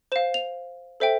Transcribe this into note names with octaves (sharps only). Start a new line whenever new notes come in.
C5 F5 E7
F7
A4 C5 E5 G5